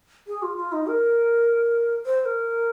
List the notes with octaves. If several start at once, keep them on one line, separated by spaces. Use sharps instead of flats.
G#4
F4
F4
D#4
A#4
C5
C5
A#4